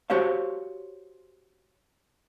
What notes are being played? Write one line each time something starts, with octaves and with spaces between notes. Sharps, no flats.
F#4 G4 C5 C#5 F5